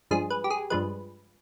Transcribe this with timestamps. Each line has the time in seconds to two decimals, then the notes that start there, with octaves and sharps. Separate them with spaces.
0.11 G2 F3 G#3 G#4
0.30 B4
0.44 G4
0.50 G#4
0.70 G2 F3 G#3 B4